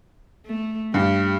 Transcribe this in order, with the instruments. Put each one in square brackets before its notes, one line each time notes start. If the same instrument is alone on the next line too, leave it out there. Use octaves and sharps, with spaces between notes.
[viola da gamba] A3
[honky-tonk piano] G2 [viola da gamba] G4